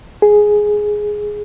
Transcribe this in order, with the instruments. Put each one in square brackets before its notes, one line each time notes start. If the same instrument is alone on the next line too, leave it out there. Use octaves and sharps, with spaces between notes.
[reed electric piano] G#4